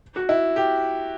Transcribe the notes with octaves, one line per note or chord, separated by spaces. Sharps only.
F#4
E4
G4